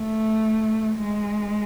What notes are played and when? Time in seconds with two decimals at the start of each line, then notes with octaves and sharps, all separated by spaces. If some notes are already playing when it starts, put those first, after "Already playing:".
Already playing: A3
0.98 G#3